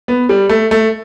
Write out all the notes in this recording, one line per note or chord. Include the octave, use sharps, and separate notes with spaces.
B3
G3
A3
A3